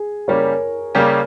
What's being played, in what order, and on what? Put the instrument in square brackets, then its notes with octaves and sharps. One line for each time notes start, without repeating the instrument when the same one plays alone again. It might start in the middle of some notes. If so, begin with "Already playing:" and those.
Already playing: [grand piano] G#4
[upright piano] C#3 G3 A#3 C#4 G4 [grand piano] A#4 C#5
[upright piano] C#3 G3 A#3 C#4 G4